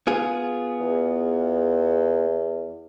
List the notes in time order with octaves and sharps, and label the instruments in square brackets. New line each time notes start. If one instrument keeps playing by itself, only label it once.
[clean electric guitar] B3 F4 G#4
[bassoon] E2